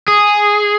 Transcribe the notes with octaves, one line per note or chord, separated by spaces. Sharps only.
G#4